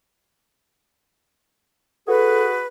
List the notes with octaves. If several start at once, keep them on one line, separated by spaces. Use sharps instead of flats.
F#4 G#4 A4 B4